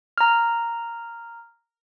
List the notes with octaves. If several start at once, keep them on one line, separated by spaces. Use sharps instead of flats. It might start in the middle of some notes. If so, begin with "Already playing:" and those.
A#5 F6